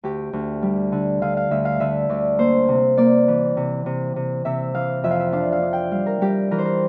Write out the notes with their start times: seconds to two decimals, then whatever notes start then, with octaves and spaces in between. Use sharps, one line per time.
0.04 D2 G4
0.33 D2
0.62 G3
0.92 D3
1.22 D3 F5
1.37 F5
1.51 D2 E5
1.65 F5
1.80 D3 E5
2.09 D2 D5
2.38 A#3 C5
2.68 C3
2.97 A#3 D5
3.28 E3
3.57 C3
3.86 C3
4.16 C3
4.45 C3 E5
4.74 E3 F5
5.04 F2 E5
5.11 F5
5.20 E5
5.32 D4 F5
5.52 F5
5.62 D4
5.73 G5
5.91 G3 F5
6.06 A#4
6.21 G3 G4
6.51 E3 A#4
6.58 C5
6.65 A#4